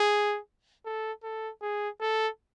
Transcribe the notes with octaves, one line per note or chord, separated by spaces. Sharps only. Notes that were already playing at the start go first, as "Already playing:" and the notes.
Already playing: G#4
A4
A4
G#4
A4